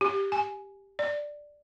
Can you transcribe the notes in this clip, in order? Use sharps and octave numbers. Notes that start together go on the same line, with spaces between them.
G4
G#5
D5